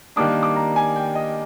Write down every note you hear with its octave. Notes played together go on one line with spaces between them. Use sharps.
D#3 G3 A#3 D4 D6
D6
A#5
G#5
G5
D#5